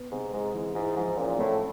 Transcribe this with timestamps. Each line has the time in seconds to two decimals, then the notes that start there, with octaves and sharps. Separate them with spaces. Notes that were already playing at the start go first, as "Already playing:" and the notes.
Already playing: B3
0.12 G#2 C3
0.33 G#2 G#3
0.54 E3
0.75 G#2 E4
0.96 G#2 F3
1.17 A#2 C#4
1.39 A2 A3